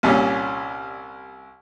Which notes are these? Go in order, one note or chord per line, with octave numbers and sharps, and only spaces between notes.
C2 A#2 G3 C#4